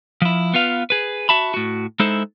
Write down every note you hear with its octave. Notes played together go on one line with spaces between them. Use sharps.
F3 E4
B3 F4 B4 F5
G#4 B4
F#4 E5 A5 B5
A2 F#4
G#3 D#4 E4 A4 C5